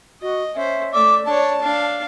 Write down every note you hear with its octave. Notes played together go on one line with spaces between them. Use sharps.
F#4 D#5
C#4 C5 E5
A3 D5 E5 D6
D4 C#5 A5
D4 F5